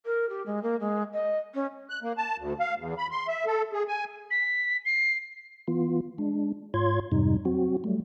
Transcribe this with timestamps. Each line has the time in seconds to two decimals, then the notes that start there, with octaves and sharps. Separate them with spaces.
0.05 A#4
0.29 G4
0.46 G#3
0.63 A#3
0.80 G#3
1.13 D#5
1.54 C#4
1.90 F#6
2.03 A#3
2.17 A5
2.38 D2
2.60 F5
2.78 E2
2.98 B5
3.11 C6
3.28 E5
3.46 A4
3.73 G#4
3.88 G#5
4.31 B6
4.85 C7
5.68 E3 B3 F4
6.18 G#3 D4
6.74 G#2 F4 C#5 C6 G#6
7.12 F2 G#2 C3 G3 D#4
7.45 F#3 C4 F#4
7.84 F#3 G3 A3